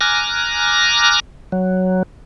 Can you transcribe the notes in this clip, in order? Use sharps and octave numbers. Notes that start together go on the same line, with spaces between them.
G#5 A#5 D6 F6 F#6 A#6
F#3